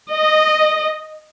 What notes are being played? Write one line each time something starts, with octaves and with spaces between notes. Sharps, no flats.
D#5